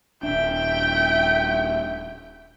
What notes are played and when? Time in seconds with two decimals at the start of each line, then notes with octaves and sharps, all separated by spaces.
0.23 D#1 D4 E5 G5